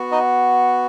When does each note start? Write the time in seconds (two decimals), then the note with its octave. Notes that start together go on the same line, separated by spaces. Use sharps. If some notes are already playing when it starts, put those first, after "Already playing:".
Already playing: B3 F#4
0.11 D#4 D#5